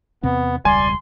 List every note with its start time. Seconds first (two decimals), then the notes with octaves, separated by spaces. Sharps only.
0.23 E2 C3 B3 C4
0.65 E1 C#2 G3 D5 G#5 C6